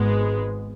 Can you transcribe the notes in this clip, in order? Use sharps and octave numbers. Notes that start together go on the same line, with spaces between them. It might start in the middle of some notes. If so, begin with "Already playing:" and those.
Already playing: G#1 G#2 G#3 B3